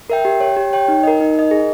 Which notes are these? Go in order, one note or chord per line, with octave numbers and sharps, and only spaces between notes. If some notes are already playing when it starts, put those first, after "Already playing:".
A#4 E5 G5
G4
C#5 G5
G4
C#5 G5
D#4
A#4 D#5
D#4
A#4 D#5
G#4